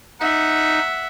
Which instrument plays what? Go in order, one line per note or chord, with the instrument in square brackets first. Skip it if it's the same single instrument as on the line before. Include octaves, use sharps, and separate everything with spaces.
[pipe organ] D#4 [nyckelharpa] E5 F#5